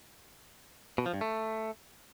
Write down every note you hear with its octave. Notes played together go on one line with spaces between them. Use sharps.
B2
F3
G2
A3